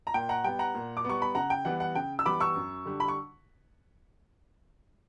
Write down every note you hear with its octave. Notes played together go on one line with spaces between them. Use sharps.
A#5
A#2 G5
F#5 A#5
G3 B3 G5
F#5 A#5
A#2
D6
G3 B3 C#6
B5
C#3 F#5 A#5
G5
E3 G3 B3 F#5
F#5
C#3 G5
E6
E3 G3 B3 B5 D6
C#6 E6
F#2
D3 G3
B5
C#6